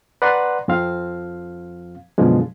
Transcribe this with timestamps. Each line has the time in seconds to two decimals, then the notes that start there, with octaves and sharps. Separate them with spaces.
0.22 B4 D5 F#5 A#5 C6
0.68 F2 F3 C4 F5
2.18 F#2 B2 D3 F3 G#3